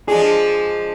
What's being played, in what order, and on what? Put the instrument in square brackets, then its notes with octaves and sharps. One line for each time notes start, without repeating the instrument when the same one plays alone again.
[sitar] F3 G#3 D4 [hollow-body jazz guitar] G#4